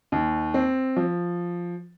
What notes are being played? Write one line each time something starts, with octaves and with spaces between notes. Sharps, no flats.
D#2
C4
F3